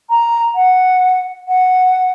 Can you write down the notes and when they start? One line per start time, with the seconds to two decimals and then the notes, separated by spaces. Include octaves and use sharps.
0.10 A#5
0.55 F#5
1.48 F#5